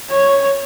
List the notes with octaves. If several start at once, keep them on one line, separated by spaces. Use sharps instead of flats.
C#5